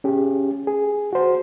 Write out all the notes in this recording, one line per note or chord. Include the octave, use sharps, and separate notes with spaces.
C#4 G4 G#4
G#4
F#4 C5